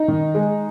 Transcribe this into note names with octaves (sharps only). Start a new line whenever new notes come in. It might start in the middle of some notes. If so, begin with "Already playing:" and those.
Already playing: D#4
D#3
G#3